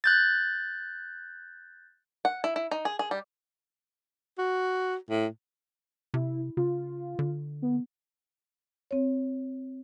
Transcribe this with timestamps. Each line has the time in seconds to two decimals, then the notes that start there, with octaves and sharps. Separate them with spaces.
0.04 F#6 G6 A6
2.25 F#5
2.44 E4
2.56 E4
2.71 D#4
2.85 G#4
2.99 G#4
3.11 G3
4.38 F#4
5.10 A2
6.14 C3 E4
6.57 C#3 F4
7.19 D3
7.62 B3
8.91 C4 C#5